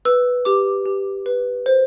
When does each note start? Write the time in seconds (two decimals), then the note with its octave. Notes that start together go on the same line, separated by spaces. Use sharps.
0.05 B4 E6
0.45 G4 D6
0.85 G4
1.26 B4
1.66 C5